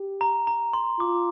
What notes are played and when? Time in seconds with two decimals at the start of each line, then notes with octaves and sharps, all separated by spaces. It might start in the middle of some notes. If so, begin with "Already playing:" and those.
Already playing: G4
0.21 A#5
0.47 A#5
0.73 C6
1.00 F4 D6